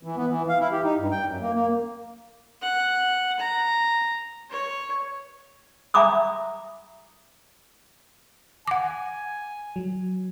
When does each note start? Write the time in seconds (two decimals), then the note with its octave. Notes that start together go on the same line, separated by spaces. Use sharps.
0.03 E3
0.16 B3
0.28 E3
0.49 F5
0.60 E4
0.72 G4
0.84 D#4
0.98 G2
1.11 G5
1.26 F#2
1.41 A#3
1.55 A#3
2.62 F#5
3.39 A#5
4.50 C#5
5.94 E5 G#5 A#5 B5 D6 D#6
8.67 F#5 G#5 D6
9.76 F#3